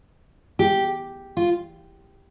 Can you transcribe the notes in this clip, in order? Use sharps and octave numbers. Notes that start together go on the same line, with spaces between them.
G4
F4